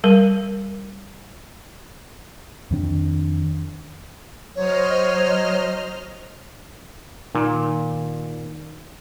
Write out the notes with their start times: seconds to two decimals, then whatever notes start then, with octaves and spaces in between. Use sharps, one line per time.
0.04 G3 A#4
2.71 F2 D#3 D4
4.56 F#3 C5 C#5 D#5 F6
7.35 A#2 D#3